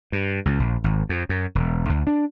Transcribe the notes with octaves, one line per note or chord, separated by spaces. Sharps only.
G2
C#2
A#1
G#1
F2
F#2
E1
D2
D4